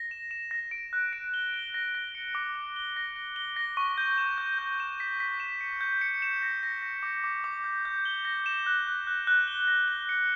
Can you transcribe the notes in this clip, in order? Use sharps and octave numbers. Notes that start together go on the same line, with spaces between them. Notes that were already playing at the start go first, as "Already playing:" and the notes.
Already playing: A#6
E7
E7
A#6
D7
F#6
D7
G7
G7
A#6
A#6
C#7
D6
D6
G7
A#6
A#6
G7
A#6
C#6
G6
E7
G6
G6
E7
B6
B6
E7
C#7
G6
C#7
E7
A#6
A#6
A#6
D6
D6
D6
G6
G6
G7
A#6
E7
F#6
F#6
F#6
F#6
G7
A#6
G7
C#7